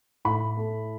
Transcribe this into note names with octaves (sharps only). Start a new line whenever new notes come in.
A2 B5
A3